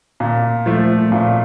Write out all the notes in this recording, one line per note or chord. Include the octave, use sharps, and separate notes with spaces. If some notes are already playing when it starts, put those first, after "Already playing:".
A#2
F3 A3
A#2